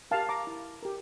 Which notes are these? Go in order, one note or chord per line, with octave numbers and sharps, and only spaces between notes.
G4 A#4 F5 A5
A#5 D6
E4
G4 A#4